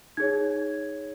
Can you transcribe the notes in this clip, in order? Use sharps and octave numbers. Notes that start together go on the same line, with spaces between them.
D#4 G#4 C#5 G#6